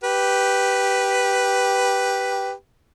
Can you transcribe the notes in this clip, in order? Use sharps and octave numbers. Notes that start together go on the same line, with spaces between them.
G4 B4